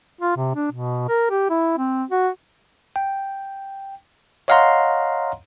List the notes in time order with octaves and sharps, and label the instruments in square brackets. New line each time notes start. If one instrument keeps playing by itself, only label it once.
[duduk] F4
C3
D4
B2
A#4
G4
E4
C4
F#4
[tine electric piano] G5
C#5 D#5 F5 F#5 A#5 C6